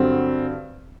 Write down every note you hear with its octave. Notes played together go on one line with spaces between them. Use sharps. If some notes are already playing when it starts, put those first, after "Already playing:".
Already playing: G2 D3 F#3 C4